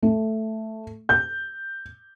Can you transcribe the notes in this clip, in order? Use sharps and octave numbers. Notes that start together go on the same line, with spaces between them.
A3
G6